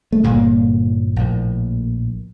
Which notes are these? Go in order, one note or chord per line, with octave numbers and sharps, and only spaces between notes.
A3
G1 G2 A#2 D3 A#3
A#1 A2